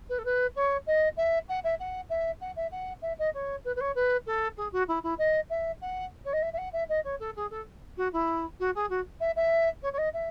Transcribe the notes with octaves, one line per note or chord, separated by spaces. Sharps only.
B4
A4
B4
C#5
D#5
E5
F#5
E5
F#5
E5
F#5
E5
F#5
E5
D#5
C#5
B4
B4
C#5
B4
A4
G#4
F#4
E4
E4
D#5
E5
F#5
C#5
D#5
E5
E5
F#5
E5
D#5
C#5
A4
G#4
A4
F#4
E4
F#4
G#4
F#4
E5
E5
C#5
C#5
D#5
E5